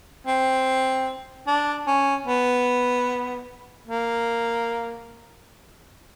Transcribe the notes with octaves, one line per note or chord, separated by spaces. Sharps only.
C4
D4
C#4
B3
A#3